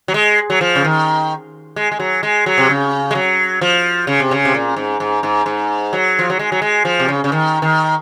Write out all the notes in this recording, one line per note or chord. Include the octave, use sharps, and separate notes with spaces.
F#3
G#3
F#3
F3
C#3
D#3
G#3
G#3
F#3
G#3
F#3
C3
C#3
G#3
F#3
F3
C#3
C3
C#3
C3
A#2
G#2
G#2
G#2
G#2
F#3
F3
F#3
G#3
F#3
G#3
F3
C3
C#3
C#3
D#3
D#3